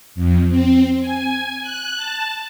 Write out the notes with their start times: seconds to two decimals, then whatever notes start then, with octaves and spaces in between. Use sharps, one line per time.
0.15 F2
0.49 C4
1.00 G#5
1.62 F#6
1.96 A5